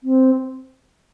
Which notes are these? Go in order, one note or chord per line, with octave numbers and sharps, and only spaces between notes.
C4